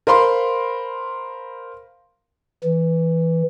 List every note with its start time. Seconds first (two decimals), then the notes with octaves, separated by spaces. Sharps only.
0.07 A#4 C5 F5 B5 C6
2.64 E3